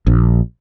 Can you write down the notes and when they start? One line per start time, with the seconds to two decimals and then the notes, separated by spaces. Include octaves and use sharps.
0.07 A#1